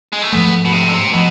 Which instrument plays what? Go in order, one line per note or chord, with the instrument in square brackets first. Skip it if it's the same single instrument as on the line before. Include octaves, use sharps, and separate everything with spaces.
[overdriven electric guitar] G#3
A3
[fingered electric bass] G#2 F3 A3 [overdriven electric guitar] B3
[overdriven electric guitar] B2
C3
D3
C3
[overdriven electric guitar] B2 [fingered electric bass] F3